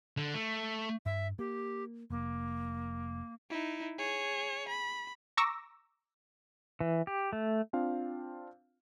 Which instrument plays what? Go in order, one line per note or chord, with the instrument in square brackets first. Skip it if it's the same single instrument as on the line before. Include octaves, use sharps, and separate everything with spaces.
[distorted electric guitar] D3
A3
[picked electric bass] G2 [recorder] E5
[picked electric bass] A#3 [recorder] G4
[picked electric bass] F1 [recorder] A#3
[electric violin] D#4 E4
G#4 C#5
B5
[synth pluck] A#5 C#6 D6 E6 A#6
[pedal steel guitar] E3
G4
A3
[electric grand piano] C4 D4 F4 F5